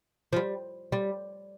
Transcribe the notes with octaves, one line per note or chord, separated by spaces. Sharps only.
F3
G3
G3